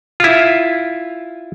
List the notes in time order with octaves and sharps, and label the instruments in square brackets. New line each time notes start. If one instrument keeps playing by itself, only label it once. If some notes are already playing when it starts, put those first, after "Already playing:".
[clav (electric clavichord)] E4 F4